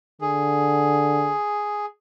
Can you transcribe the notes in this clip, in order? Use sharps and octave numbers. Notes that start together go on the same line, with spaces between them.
D3 G#4